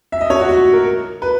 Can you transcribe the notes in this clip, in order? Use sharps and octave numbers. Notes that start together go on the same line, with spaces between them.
E5
D#5
C#5
F#4
F#4
A#4
B4